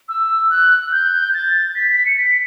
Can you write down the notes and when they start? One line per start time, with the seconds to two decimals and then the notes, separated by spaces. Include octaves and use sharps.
0.09 E6
0.50 F#6
0.92 G6
1.34 A6
1.75 B6
2.05 C#7
2.17 B6